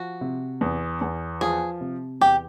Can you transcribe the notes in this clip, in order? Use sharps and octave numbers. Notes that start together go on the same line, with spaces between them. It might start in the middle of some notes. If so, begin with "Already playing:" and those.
Already playing: F3 F#4
C3
E2
E2
F3 G#4
C3
E2 G4